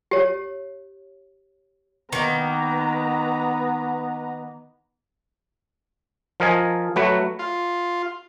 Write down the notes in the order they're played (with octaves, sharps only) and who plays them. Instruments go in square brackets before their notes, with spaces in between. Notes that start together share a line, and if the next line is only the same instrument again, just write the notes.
[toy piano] G4 C#5
[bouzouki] D#3 A#3 [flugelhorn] B3 [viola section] B4 A#5
[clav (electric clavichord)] F3 A#4 D#5 G#5 A5
F#3 A3 F#4 B4 F#5
[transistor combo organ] F4